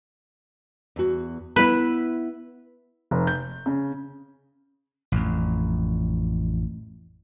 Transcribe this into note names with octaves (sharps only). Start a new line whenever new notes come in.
E2 F#4
B3 E4 B4 E5
F1
G6
C#3
A1 F2